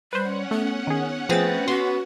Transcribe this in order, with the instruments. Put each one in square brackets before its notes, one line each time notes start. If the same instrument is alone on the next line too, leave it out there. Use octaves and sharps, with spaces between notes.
[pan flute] G3 [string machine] C#4 F#5 [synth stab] B4 C5
[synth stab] A3 [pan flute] B3
[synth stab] D#3 G#4
[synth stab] F3 G#4 A6 [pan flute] A3 [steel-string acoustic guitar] B3 C4
[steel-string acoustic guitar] B3 [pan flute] F#4 [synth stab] C6